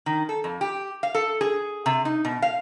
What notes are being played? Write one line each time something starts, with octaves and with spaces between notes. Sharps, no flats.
D#3
A4
F2
G4
F5
A4
G#4
C3
D#4
B2
F5